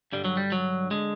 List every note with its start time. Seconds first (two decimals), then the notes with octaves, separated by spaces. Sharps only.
0.12 G2 D3 G3
0.25 F#3
0.37 G3
0.52 F#3
0.91 D3 G#3